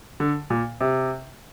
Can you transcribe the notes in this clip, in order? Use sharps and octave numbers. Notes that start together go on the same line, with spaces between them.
D3
A#2
C3